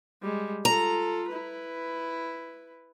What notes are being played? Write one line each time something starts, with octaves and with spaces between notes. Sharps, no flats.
G3 G#3
F4 A4 A#5
E4 B4